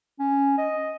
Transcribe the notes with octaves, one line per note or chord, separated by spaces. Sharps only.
C#4
D#5